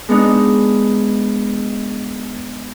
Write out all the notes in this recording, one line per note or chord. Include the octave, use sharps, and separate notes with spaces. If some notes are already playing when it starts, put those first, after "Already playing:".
G#3 B3 D4 D#4